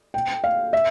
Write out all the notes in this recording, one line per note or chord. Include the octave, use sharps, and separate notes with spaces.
G5
F5
E5